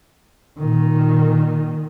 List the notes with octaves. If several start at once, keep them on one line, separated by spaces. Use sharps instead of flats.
A#2 D#3